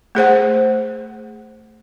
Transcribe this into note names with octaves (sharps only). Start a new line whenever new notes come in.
A3 G#4 C5 F#5